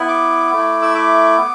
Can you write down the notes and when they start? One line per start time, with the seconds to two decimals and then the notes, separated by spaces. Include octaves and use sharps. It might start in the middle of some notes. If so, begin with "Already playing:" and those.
Already playing: B3 E4
0.08 D6
0.52 A3 E4
0.82 E6
0.94 D6
1.38 B3